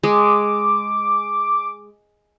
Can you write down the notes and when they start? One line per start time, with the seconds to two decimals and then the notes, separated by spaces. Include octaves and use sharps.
0.03 G#3 D6